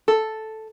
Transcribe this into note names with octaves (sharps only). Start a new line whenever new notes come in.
A4